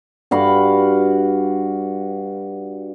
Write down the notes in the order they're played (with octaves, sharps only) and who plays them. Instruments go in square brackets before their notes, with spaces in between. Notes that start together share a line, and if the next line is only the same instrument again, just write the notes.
[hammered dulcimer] G2 F#4 F5 B5